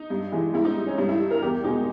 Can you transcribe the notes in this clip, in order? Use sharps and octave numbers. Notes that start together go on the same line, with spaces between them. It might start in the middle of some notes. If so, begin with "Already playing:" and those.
Already playing: D#4
G2
E3 G#3
G#2 E4
D#4
G3
C#4
G2 D#4
E4
G3
A#4
E2 G4
B2 G#3 D#4